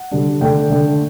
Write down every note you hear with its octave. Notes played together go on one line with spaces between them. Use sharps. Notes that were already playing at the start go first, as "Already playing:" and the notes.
Already playing: F#5
D3 G3 D4
D3 A3 D4 G5
D3 A3 D4